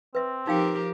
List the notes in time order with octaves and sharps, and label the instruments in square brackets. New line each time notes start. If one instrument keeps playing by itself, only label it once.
[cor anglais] C4 [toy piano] B4 E5
[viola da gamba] F3 G4 A#4 [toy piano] D#4 F5 G5